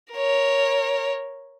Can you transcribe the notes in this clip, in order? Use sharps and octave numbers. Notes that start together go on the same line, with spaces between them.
A#4 C#5